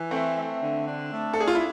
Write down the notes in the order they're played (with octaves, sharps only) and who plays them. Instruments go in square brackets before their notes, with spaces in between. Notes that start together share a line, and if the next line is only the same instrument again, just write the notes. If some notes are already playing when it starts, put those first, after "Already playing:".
Already playing: [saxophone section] E3
[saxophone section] A3 [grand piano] C4
[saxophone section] A3
D3
D4
A3
[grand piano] A4
[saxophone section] D4 [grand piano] G#4
[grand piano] F4
E4